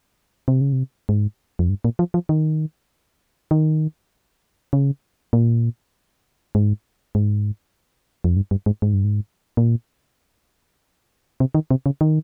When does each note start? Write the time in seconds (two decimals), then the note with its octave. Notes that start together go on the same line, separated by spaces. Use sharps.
0.48 C3
0.61 C#3
0.73 C3
1.09 G#2
1.59 F2
1.69 G2
1.85 A#2
1.99 F3
2.14 F3
2.29 D#3
3.51 D#3
4.73 C#3
5.33 A#2
6.55 G#2
7.15 G#2
8.24 F2
8.36 G2
8.51 G2
8.66 G#2
8.82 G#2
8.94 G2
9.04 G#2
9.57 A#2
11.40 C3
11.55 D#3
11.71 C3
11.86 C#3
12.01 D#3